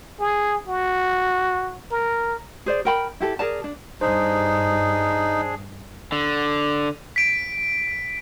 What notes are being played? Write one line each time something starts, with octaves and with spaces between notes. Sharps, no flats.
G#4
F#4
A#4
G#4 C5 D5
A#4 G5 B5
E4 G4 A4
G#4 A#4 D5 A5
D4
G2 D4 D#4 G#4 C5
D3
B6 D7